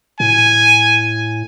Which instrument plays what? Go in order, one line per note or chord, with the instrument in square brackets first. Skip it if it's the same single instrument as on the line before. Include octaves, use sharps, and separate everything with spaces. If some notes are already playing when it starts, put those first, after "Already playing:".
[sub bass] A2 [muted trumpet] G#5